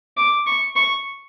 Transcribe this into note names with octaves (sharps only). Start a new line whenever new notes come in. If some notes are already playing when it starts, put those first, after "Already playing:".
D6
C#6
C#6